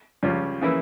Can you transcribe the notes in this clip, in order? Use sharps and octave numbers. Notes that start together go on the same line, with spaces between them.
C#2 C#3 G3 C#4 F4
C#3 E3 A#3 E4